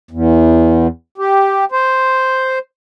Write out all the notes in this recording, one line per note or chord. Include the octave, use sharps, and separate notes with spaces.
E2
G4
C5